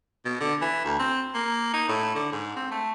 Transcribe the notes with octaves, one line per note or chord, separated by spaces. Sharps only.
B2
D3
E3
D2
C4
A#3
D#4
A2
D3
G#2
C4
A3